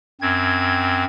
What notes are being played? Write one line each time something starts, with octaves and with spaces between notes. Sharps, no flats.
F#2 C4 G#6